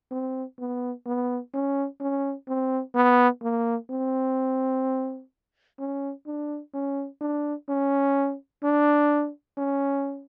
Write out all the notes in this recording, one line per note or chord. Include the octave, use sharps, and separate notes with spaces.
C4
B3
B3
C#4
C#4
C4
B3
A#3
C4
C#4
D4
C#4
D4
C#4
D4
C#4